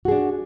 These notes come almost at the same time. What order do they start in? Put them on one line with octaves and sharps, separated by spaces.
F#4 G#4 D4